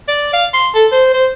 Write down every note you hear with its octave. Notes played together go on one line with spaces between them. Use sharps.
D5
F5
C6
A4
C5
C5